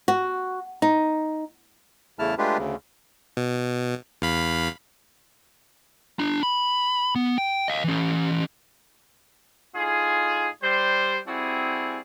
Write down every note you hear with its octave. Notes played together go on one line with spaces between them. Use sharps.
F#4
D#4
E2 C#3 A3 E4 A5 F6
G#3 A3 D4 F4 G4 B4
D2 C#3
B2
E2 F5 B5
D4 A#5
B5
B3
G5
D#5 F5
E3 C#4
A2 D#4 F4 G#4
G3 C5
G3 C4 E4 F#4 G#4